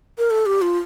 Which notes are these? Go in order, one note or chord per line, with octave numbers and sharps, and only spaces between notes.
A#4
A4
G4
F4